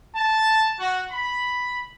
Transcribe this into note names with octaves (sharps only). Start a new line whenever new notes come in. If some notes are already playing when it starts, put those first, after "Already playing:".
A5
F#4
B5